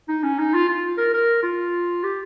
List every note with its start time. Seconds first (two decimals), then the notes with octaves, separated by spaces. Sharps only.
0.08 D#4
0.23 C#4
0.38 D#4
0.54 F4
0.69 F4
0.98 A#4
1.14 A#4
1.43 F4
2.03 G4